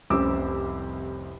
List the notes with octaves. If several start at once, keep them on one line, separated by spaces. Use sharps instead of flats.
F1 C2 C4 C#4 D6 E6